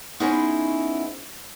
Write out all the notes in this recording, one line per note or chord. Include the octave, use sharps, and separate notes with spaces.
B3 C#4 D#4 E4 G#4 C5